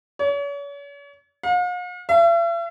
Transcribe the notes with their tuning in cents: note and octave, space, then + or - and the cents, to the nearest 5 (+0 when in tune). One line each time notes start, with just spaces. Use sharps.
C#5 +40
F5 +45
E5 +45